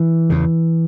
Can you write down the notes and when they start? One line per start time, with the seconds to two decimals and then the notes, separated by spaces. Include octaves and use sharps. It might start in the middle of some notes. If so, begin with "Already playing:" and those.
Already playing: E3
0.30 E2 C#3